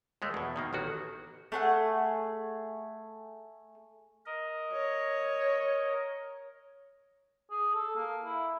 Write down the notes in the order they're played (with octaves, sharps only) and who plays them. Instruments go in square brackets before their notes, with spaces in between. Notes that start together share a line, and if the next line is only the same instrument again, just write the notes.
[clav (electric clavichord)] D#2 G#3 A3
E2 B2
B2 D#3 A#3
A1 D#3 F#4
[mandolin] A3 G#4 F#5
[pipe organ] A#4 D#5
[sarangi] C#5
[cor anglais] G#4
A4
A#3
E4